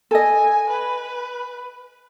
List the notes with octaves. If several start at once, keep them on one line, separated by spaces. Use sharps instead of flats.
A4 D#5 G#5
B4